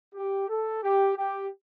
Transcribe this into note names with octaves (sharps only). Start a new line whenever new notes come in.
G4
A4
G4
G4